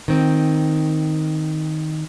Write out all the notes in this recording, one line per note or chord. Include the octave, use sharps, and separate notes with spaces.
D#3 C4